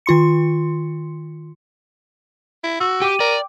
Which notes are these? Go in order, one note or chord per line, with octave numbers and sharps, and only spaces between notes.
D#3 F4 C6 C#7
E4
F#4 E6
G4 G5 D6 D#7
A#4 D5